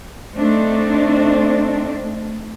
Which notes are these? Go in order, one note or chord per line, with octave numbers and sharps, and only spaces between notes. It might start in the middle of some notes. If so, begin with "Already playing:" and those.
A3 C4 D4 D#4